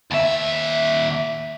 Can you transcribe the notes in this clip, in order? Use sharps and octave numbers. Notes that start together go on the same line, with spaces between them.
D#2 E5